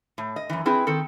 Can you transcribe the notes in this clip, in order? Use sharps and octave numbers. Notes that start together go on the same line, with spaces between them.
A2
D#5
F#2 E3
C4 E4 G#4 B4
D#3 C4 A4